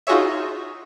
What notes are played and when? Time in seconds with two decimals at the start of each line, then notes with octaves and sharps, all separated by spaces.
0.07 D#4 F4 F#4 G#4 C#5 E5